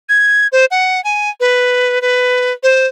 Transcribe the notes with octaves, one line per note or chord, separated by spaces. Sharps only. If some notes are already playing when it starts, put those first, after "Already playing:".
G#6
C5
F#5
G#5
B4
B4
C5